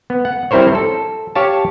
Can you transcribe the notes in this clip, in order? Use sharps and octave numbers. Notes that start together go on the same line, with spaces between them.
B3
F#5
G3 C4 E4 A#4 C5 C#5
A4
G4 C#5 F5 A5